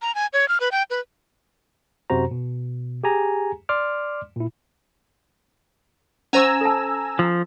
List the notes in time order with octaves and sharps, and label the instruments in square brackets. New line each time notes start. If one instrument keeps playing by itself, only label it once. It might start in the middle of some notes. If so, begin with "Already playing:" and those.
[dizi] A#5
G#5
C#5
F6
B4
G5
B4
[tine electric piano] F#2 C3 F#4 C5 A#5
B2
G4 G#4 G#5 A#5
D5 C6 D6 F6
A#2 E4
[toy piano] C#4 C5 C#6 [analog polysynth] G#5 A#5 E6
[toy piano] A4 A5
[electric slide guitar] F3